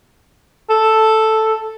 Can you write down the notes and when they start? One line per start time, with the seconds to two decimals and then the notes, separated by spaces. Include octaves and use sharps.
0.70 A4